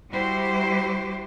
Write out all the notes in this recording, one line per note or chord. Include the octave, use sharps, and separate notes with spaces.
G3 E4 F#4 G4 C5